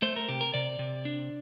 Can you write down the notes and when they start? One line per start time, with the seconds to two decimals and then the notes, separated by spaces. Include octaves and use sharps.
0.02 A3 C5
0.16 A#4
0.29 C3 G4
0.41 A#4
0.54 C3 D5
0.79 C3
1.05 D4